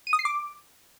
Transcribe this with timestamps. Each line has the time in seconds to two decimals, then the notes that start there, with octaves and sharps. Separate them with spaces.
0.07 D#7
0.13 D#6
0.19 C7
0.25 D6